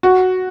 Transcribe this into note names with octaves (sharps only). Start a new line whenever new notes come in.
F#4